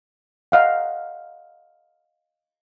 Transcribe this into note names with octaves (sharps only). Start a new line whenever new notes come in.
D#5 F5 F#5